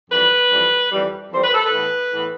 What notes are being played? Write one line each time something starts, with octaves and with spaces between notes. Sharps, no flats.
F2 E3 G3 B4
F2 E3 G3
F2 E3 G3
F2 E3 G3 C5
B4
A4
B4
A2 E3 B3
A2 E3 B3